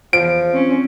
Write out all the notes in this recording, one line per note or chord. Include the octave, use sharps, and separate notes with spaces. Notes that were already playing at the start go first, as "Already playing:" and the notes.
E2 F3 D7
C4 C#4